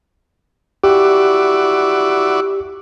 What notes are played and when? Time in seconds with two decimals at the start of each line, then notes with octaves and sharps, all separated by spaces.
0.84 E4 F#4 G4 D5